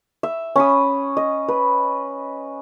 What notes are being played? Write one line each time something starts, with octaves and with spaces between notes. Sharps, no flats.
E5
C#4 B5 D#6
D#5
B4